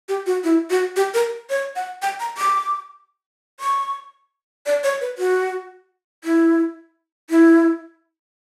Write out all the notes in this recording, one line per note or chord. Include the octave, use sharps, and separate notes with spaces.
G4
F#4
E4
F#4
G4
A#4
C#5
F#5
G5
A#5
D6
C#6
D5
C#5
B4
F#4
E4
E4